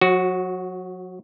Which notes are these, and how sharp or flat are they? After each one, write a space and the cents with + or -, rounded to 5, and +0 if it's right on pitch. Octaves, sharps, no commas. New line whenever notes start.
F#3 -40 F#4 +0